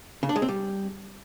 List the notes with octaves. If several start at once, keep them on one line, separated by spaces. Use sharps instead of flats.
C#3
D4
G#3
C4
G3